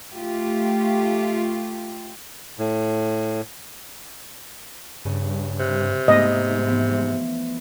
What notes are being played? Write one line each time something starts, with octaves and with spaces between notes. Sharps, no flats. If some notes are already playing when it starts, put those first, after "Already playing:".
A3 F4 G4
A2
G2 C#3
C3 F#6
G#2 A3 B3 D#4 D#5
E3 F3 B3